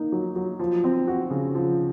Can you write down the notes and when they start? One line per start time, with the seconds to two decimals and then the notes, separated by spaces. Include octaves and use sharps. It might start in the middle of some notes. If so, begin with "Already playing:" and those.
Already playing: A#3 D#4
0.12 F#3
0.36 F#3
0.59 F3
0.84 C4
1.07 F#4
1.30 C#3
1.55 F3